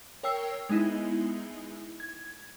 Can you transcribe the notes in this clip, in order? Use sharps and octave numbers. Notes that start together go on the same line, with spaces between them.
A#4 C#5 G5 E6 C7
G#3 B3 D#4 E4
G#6